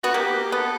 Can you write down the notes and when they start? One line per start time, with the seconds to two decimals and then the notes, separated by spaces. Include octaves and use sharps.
0.03 B3 F#4
0.14 A#3 G4
0.51 B3 A4